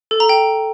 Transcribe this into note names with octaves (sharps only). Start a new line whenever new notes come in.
A4
A#5
G5